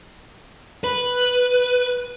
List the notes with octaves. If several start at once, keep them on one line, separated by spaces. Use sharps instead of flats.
B4